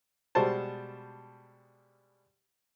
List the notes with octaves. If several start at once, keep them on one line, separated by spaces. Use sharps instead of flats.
B2 G3 G#3 C5 A5